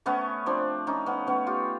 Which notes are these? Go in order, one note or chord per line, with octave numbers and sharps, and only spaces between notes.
A3 B3 C#4
F3 C4 D4
F3 C#4 D#4
B3 C#4
A3 B3 C#4
F4 G4